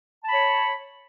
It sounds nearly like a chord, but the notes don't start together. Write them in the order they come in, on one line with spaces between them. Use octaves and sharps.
A5 B5 C#5